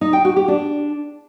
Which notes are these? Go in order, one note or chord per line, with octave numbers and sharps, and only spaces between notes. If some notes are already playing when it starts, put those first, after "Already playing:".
D#4
G5
F#4
G4
D4